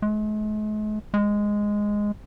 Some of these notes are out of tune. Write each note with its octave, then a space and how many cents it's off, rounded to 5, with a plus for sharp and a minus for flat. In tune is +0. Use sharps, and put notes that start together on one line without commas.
G#3 +45
G#3 -5